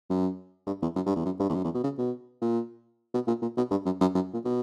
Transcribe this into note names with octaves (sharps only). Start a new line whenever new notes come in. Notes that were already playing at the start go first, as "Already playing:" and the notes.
F#2
G2
E2
F#2
G2
E2
F#2
G2
E2
F#2
E2
B2
C#3
B2
A#2
B2
A#2
A#2
B2
G2
F#2
F#2
F#2
A#2
B2